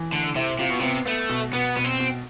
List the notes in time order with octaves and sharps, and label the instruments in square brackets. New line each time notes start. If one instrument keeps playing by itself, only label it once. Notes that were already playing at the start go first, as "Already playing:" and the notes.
Already playing: [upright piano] E3
[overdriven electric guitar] D3 [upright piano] A3
[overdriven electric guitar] C3 [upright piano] E4
[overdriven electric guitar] C3 [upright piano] F4
[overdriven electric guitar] B2
[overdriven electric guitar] C3 [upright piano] B3
[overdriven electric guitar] A3 [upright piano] B3
[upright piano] B2
[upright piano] B2 [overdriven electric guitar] B3
[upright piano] B2 [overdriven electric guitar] B3
[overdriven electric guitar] C4
[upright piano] B2